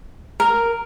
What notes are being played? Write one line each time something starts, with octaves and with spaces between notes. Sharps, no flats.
A#4